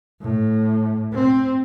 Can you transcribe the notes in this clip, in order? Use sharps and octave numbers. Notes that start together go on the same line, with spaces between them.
A2
C4